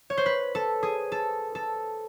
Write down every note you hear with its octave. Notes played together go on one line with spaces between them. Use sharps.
C#5
C5
B4
A4
G#4
A4
A4